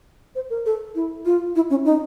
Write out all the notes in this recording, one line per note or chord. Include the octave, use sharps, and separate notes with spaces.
C5
A#4
A4
E4
F4
E4
C#4
D#4